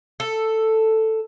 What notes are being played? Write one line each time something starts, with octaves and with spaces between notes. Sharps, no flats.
A4